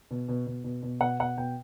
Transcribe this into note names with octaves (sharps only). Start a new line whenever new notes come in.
B2
B2
B2
B2
B2
B2 F#5
B2 F#5
B2 G5